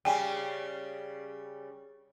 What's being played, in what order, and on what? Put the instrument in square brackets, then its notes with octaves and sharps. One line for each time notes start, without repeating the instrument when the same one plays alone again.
[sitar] C#3 G3 [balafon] G5 G#5